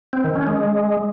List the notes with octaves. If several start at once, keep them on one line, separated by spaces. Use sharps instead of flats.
C4
D#3
C#4
G#3